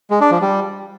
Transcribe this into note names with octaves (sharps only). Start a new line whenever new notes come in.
G#3
D4
F3
G3